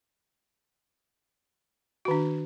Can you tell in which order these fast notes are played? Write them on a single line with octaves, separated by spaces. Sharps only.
F#4 D#3 D4